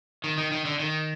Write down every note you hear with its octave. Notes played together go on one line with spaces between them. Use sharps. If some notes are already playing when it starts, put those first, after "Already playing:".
D#3
D#3
D#3
D3
D#3